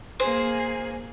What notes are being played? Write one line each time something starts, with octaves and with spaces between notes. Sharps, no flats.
A#3 G#4 C5